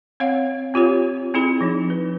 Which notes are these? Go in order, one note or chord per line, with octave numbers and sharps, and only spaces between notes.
C4 C#5 F5 F#5
C4 F4 G4 C#5
C4 E4 G#4 B5
F3 D#4
B4